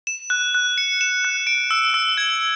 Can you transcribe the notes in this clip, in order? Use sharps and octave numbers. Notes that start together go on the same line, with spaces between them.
E7
F#6
F#6
C#7
E7
F#6
D7
E6
E6
G#6